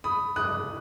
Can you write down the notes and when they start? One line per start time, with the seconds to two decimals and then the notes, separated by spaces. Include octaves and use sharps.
0.04 B5 D#6
0.36 D#6 F#6